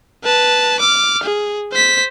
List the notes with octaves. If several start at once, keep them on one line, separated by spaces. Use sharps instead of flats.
B4 A5
D6 F6
G#4
C5 B6